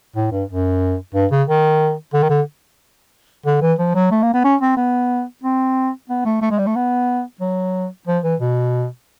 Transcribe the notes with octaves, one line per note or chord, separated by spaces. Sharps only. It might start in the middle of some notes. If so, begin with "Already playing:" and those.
A2
G2
F#2
G2
C#3
D#3
D3
D#3
D3
D3
E3
F3
F#3
A3
A#3
B3
C#4
C4
B3
C4
B3
A3
A3
G#3
G3
A3
B3
F#3
F3
E3
B2